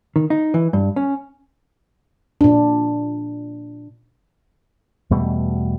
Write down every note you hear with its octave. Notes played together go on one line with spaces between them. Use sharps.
D#3
D#4
E3
G2
C#4
A#2 D4
E2 B2 G3 A3